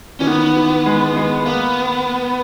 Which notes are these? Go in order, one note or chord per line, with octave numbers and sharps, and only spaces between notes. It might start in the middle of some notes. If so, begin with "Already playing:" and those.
E3 C#4
D#3 B3
E3
G#3
G#3
A#3 B3